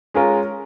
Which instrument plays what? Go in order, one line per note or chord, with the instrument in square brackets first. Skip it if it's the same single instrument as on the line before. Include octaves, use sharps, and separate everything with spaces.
[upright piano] G#3 C#4 F4 A#4